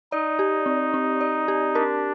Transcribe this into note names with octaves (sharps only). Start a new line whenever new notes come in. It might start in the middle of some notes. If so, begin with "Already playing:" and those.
D#4 D5
G4
C4
C4
D5
G4
D4 A#4